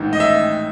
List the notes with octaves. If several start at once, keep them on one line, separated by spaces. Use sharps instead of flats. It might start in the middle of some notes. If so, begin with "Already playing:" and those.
Already playing: A1 G#2 D#3
D#5
E5